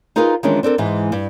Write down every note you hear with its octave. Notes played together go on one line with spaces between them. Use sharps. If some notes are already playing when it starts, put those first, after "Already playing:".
D#4 F4 G#4 A#4 B4 F5
D#3 E3 G#3 C#4 D4 F4
C4 D4 A4 A#4
G#2 E3 G#3
G2